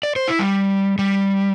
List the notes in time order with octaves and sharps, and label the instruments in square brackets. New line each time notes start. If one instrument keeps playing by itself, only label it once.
[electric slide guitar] D5
C5
E4
G3
G3